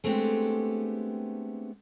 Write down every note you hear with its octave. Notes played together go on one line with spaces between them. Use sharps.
G#3 A3 B3 C4 D4 G4